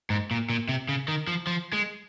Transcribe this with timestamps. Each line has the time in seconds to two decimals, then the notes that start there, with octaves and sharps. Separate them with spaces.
0.10 G#2
0.31 A#2
0.50 A#2
0.69 C3
0.89 C#3
1.08 D#3
1.27 F3
1.47 F3
1.73 G#3